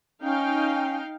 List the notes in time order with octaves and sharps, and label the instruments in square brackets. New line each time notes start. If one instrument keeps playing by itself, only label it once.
[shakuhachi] C#4 [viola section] D#4 F5 G5